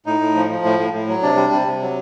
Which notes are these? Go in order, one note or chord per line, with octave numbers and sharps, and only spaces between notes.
A2 D#4
A2
F3
F3
A2
A2
A2
F#3
C3 D4
G3
C3
C3
F#3